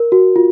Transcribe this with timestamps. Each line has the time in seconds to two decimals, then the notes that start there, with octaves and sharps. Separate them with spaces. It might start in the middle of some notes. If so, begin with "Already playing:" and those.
Already playing: A#4
0.12 F#4
0.36 F4